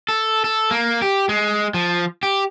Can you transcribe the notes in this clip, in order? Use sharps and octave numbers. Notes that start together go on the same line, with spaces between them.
A4
A4
A#3
G4
G#3
F3
G4